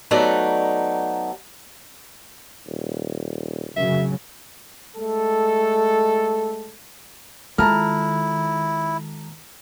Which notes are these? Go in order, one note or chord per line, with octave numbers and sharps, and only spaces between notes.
F#3 A3 B3 D#4 D5 F#5
D#1
F1 F#2 C#3 F#3 E5
G#3 A3 A4
D#3 G#3 E4 F4 A4 A5 A#5 F6